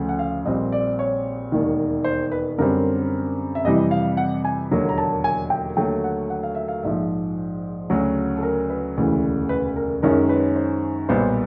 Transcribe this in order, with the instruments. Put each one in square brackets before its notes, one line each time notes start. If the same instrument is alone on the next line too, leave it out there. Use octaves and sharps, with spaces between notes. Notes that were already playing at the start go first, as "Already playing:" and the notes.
Already playing: [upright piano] D2 C#3 F3 A3
F#5
F5
A#1 A#2 G3 C4 D#5
D5
C#5
E1 D#2 D#3
C5
B4
F#2 D3 G3 C4 A#4
E5
F2 C3 E3 G3 D#5
F5
F#5
G#5
E1 D#2 D3 F#3 A#3
A#5
A5
G#5
G5
D#2 D3 F#3 A3 G5
F#5
F#5
F5
E5
F5
A#1 G#2 F3 E5
D2 C#3 F#3
A4
A#4
B4
E1 D2 C#3 E3
B4
A#4
F#2 D#3 G#3 C#4 A#4
B4
C5
B1 A#2 G3 B3 C5